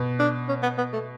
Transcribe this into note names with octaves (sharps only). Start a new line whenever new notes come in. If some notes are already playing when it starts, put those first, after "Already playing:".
Already playing: B2
D4
C#4
B3
B3
A3